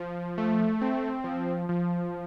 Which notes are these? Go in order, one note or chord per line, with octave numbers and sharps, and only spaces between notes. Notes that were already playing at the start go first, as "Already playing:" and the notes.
Already playing: F3
A3
C4
F3
F3